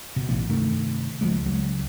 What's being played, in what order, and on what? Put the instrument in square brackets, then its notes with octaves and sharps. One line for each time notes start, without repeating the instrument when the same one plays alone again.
[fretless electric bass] B2
A1
G2 C3 D#3 A3
C#2 F#2 F3 G#3
C#2 F#3 G#3